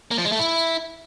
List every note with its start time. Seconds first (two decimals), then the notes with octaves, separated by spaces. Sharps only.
0.11 A#3
0.18 F3
0.25 G#3
0.32 A3
0.39 E4